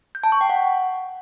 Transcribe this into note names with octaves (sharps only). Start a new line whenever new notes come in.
G6
A5
C#6
G5
F#5